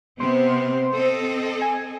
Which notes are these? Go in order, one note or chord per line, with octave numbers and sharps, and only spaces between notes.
C3 B3 C4 C5
C4 A4 D#5
G#5